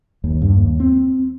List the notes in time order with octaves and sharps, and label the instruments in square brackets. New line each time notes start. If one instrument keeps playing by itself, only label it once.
[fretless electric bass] D#2
G2
D#2
C4